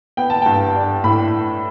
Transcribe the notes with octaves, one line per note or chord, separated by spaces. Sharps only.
B3 G5
A5
G2 G5
D4
A2 B5